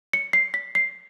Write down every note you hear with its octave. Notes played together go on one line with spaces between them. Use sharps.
C#7
C7
B6
C7